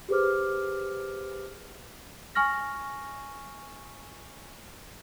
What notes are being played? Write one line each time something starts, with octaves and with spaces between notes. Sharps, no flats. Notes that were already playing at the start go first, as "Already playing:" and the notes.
G4 G#4 B4 C5 D6 F6
G#5 C#6 F6 A#6